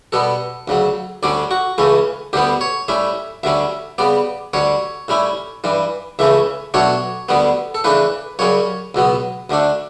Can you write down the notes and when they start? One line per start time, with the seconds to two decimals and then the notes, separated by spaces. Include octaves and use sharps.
0.12 B2 G3 B3 A4
0.68 D2 C#3 F#3
1.23 D2 D3 G3 C#4 D5
1.51 F#4
1.78 C#2 C#3 E3 A3 C#4
2.33 D2 D3 G3 B3 G4
2.61 C#5
2.88 A2 G3 C#4 E5
3.43 D2 D3 G3 C#4 E5
3.98 C#3 G3 B3 D5
4.53 D2 D3 G3 C#5
5.08 A2 G3 C#4 E4
5.64 G2 E3 G3
6.19 C#2 C#3 E3 A3 C#4 E5
6.74 B2 F#3 A3 D4 C#5
7.29 D2 D3 G3 B3
7.75 A4
7.84 C#3 E3 A3 D4 B4
8.39 F#2 C#3 G3 C#4 C#5
8.95 C#2 B2 F#3 B3
9.50 D2 D3 A3 D4